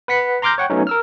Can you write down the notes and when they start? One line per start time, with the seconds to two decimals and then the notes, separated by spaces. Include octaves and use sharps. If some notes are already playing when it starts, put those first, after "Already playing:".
0.08 B4 F#5 B6 C#7
0.42 A#5 C6 D6 F6 G6 A#6
0.58 C#5 F#5 G5
0.70 F#3 A3 B3 C#4 D#4
0.87 A#4 E6 F6